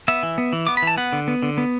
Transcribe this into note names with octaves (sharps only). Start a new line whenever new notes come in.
B3 E5
E3
B3
E3
B3 D6
B5
E3 A5
B3 F#5
D3
B3
D3
B3